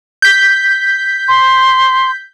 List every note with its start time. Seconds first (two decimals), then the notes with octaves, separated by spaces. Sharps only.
0.22 G6 B6
1.28 C6